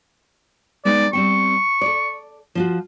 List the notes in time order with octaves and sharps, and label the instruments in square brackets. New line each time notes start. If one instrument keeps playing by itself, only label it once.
[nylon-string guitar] G#3 B3 D#4 [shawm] D5
[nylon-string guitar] G3 C4 G5 [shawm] C#6
[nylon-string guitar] A4 D5
F3 F4 F#4